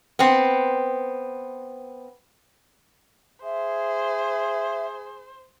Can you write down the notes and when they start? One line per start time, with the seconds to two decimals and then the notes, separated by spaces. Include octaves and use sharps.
0.19 B3 C4
3.43 G#4 C5 E5